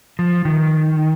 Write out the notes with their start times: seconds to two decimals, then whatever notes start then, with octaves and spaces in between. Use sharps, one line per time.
0.19 F3
0.45 D#3